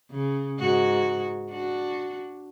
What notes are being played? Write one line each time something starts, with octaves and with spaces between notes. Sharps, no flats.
C#3
G#2 F#4
D4 F#4